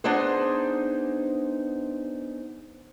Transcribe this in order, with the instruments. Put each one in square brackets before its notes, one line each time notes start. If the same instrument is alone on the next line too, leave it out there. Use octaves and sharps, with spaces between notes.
[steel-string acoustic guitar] B3 D4 D#4 G#4 C5